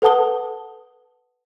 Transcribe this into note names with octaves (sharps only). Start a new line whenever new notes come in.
A4 B4 F#5 A5 D#6 G7